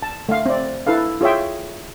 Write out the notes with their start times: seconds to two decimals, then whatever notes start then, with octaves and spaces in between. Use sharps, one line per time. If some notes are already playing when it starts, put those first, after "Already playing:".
0.03 A5
0.29 A3 F5
0.46 C4 D5
0.87 E4 A4 B4 F5
1.21 F4 G#4 C#5 E5 G5